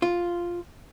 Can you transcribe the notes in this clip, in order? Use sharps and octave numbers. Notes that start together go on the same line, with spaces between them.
F4